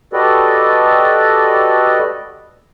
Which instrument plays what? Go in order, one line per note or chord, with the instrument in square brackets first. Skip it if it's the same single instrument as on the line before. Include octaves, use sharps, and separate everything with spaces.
[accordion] F#4 G4 A4 B4 D5 D#5